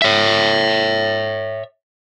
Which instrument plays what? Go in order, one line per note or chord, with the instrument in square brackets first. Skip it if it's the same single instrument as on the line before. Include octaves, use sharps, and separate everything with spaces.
[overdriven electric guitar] C#5 E5